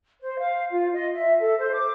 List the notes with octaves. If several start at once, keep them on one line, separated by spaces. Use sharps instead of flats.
C5
F5
F4
D#5
E5
A4
C5
D6